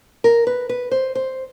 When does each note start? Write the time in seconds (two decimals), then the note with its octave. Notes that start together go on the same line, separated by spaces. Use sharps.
0.24 A#4
0.47 B4
0.69 B4
0.91 C5
1.15 C5